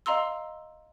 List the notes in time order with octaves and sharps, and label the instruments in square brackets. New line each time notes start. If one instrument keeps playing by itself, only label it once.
[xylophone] D#5 F5 A#5 C6 E6